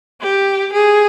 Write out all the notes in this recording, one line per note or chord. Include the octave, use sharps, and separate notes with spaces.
G4
G#4